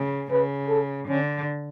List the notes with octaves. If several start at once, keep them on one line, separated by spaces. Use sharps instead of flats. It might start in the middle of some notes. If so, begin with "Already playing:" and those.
Already playing: C#3
C#3 B4
A4
D3 C#4